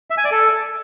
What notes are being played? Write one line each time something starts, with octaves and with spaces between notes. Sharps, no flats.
E5
G#5
D5
A4